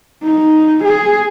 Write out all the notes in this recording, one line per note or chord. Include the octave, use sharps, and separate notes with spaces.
D#4
G#4